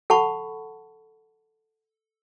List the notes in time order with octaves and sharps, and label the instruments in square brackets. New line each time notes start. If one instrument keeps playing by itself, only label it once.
[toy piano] A4 F#5 A5 B5 C#6